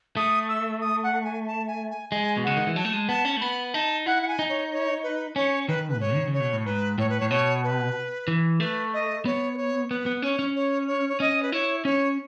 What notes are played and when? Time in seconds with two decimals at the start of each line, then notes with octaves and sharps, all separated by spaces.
0.17 A3 D#6
0.49 E6
0.81 D#6
1.04 F#5
1.24 G#5
1.47 A5
1.68 G#5
1.90 G#5
2.11 G#3 G#5
2.37 B2
2.44 C#3 F#5
2.57 D#3
2.67 E3
2.76 F#3 A5
2.85 A3
2.93 G#3
3.09 B3 A5
3.25 C#4
3.37 A3
3.41 B3 B5
3.74 D#4 A5
4.06 E4 F#5
4.22 F#5
4.28 G#5
4.39 D#4
4.49 C#5
4.72 C#5
5.03 B4
5.36 C#4 C#5
5.68 D#3 B4
5.89 B4
5.95 A2
6.00 G#2 C#5
6.15 D#3
6.27 C#3
6.34 C#5
6.40 B2
6.53 A2
6.66 G#2 B4
6.98 A2 C#5
7.09 B4
7.20 A2 C#5
7.30 B2 C#5
7.64 B4
8.28 E3
8.60 A3 B4
8.94 D#5
9.25 B3 C#5
9.54 B4
9.57 C#5
9.90 B3 B4
10.06 B3
10.22 C#4 C#5
10.39 C#4
10.56 C#5
10.87 C#5
11.09 C#5
11.20 C#4 D#5
11.43 B4
11.52 E4 C#5
11.85 C#4 C#5